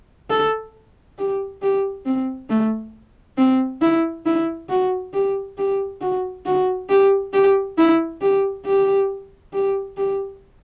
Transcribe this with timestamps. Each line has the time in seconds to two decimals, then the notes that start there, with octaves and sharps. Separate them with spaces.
0.30 A4
1.18 G4
1.62 G4
2.06 C4
2.50 A3
3.38 C4
3.82 E4
4.26 E4
4.70 F#4
5.14 G4
5.58 G4
6.01 F#4
6.46 F#4
6.89 G4
7.33 G4
7.78 E4
8.21 G4
8.65 G4
9.53 G4
9.97 G4